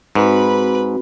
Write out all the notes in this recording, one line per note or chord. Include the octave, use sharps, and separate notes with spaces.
G#2 C4 F#4 B4 B5